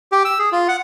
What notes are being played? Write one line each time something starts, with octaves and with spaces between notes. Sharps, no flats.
G4
E6
G#4
F4
F#5